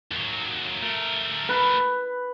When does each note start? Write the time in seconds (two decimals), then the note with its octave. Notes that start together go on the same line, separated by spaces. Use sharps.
0.12 D#2 F#3
0.82 A3 A#4
1.49 B4